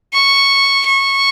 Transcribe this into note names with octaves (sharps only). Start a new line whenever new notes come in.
C#6
C#6